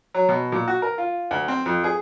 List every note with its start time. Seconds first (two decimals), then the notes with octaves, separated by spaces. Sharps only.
0.14 F#3
0.29 B2
0.52 A#2
0.68 F#4
0.82 A#4
0.98 F4
1.31 D2
1.48 C4
1.66 F2
1.84 G#4